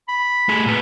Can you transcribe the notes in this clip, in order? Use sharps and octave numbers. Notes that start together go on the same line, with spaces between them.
B5
A3 G#4
A#2 B4